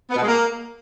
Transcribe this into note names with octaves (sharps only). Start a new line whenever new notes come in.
B3
B2
G#3
A#3